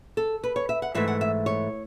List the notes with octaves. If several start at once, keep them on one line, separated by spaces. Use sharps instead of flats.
A4
B4
C#5
E5
F#5
G#2 E3 A3 E5
F#5
E5
C#5